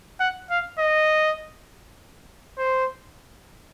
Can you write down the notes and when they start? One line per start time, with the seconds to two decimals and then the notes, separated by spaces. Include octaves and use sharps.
0.20 F#5
0.50 F5
0.79 D#5
2.58 C5